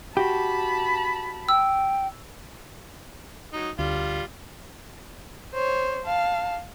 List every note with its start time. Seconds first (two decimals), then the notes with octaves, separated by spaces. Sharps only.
0.17 F#4 G4 A5 B5
1.49 G5 E6
3.53 F#3 D#4
3.79 D2 G3 F4
5.54 C5 C#5
6.05 F5 A5